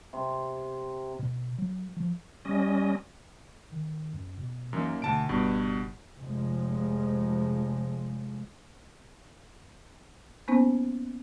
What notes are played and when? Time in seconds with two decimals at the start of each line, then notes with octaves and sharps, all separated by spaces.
0.13 C3 C6
1.19 B2
1.58 F#3
1.97 F3
2.45 G3 C#4 D#5
3.72 D#3
4.13 F#2
4.38 B2
4.73 F#2 E3 A#3 D#4
5.02 D2 B2 A5 D7
5.29 F#1 G2 B2
6.18 F1 F3 G#3
10.48 A#3 B3 C#4 D#4 C5 G#5